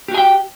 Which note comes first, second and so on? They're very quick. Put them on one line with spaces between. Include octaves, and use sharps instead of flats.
G4 F#4 G#5 G5